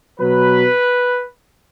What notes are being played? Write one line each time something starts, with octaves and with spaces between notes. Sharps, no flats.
B2 F#3 B4